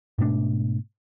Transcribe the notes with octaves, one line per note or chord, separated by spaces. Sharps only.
G#2 B2 A3 D4